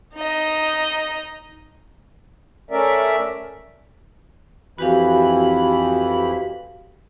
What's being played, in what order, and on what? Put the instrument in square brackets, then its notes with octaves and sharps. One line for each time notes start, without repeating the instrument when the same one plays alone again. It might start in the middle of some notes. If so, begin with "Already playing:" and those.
[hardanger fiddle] D#4 D#5
[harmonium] A3 C#4 A#4 D5 E5
[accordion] F2 E3 B5 [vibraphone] F#4 G4 F5